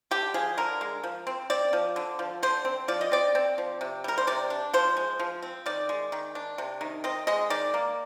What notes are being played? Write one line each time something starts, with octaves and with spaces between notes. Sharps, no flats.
D3 G4
F3 G#4
D3 A#4
G#3
F3
C4
C4 D5
F3
D3
F3
D3 C5
C4
F3 D5
D#5
C4 D5
C4
F3
C3
G3 A#4
C5
C3 D5
D4
F3 C5
G#3
F3
C4
D#3 D5
G#3
D#3
D4
C3
D#3
C4 D#5
G#3 D#5
D#3 D5
A#3